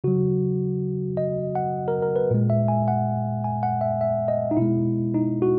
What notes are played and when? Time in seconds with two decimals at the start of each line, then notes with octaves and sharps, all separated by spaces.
0.04 C#3 F#3 F#4
1.17 D#5
1.55 F#5
1.88 A#4
2.02 A#4
2.16 B4
2.31 A#2 G#3
2.50 E5
2.68 G#5
2.88 F#5
3.44 G#5
3.63 F#5
3.81 E5
4.01 E5
4.28 D#5
4.51 D#4
4.57 B2 G#3 E4
5.14 D#4
5.42 F#4